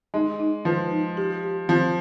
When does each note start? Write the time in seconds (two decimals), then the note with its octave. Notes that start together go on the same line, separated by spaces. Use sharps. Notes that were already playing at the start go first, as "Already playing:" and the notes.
0.14 G#3 D#4
0.40 D#4
0.65 F3 B4
0.91 D#4
1.17 G4
1.43 G4
1.68 F3 C4